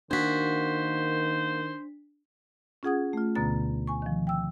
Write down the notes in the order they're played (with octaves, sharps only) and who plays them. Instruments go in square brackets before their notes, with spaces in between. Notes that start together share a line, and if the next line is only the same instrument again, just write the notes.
[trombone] D#3 [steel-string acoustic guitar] A#3 F#4 [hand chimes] D4 B6 [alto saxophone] C5
[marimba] C#4 F4 G#4 F#5 D#6 G#6
A3 F4
D2 B2 D3 B3 A#5 A6
G#5 C#6
D#3 F3
G5 E6